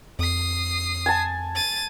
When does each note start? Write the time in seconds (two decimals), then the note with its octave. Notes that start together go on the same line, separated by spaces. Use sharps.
0.19 F2 D#6 C7
1.06 G#5 A5
1.55 A6 D#7